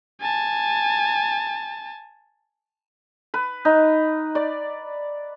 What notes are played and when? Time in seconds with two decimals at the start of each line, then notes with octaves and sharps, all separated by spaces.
0.21 G#5 A5
3.34 B4
3.65 D#4
4.35 D5